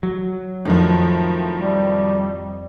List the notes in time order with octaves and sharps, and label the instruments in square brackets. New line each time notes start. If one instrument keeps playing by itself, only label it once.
[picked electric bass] F#3
[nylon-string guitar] F2 [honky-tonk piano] A2 D#3 F3
[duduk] G3